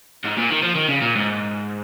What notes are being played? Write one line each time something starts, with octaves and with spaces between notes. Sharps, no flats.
G#2
A#2
D#3
F3
D#3
C#3
A#2
G#2